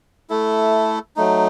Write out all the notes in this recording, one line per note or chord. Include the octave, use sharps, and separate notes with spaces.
A3 E4 A4
F#3 A3 D#4